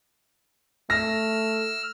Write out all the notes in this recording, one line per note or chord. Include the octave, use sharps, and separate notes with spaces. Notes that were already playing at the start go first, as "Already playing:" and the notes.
A3 E6 F6 A#6